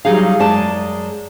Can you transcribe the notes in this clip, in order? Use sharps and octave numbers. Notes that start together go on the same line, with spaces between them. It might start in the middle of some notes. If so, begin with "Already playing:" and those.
F#3 G3 D#4 G#4 F5
F#2 G#3 G#4 D5 A5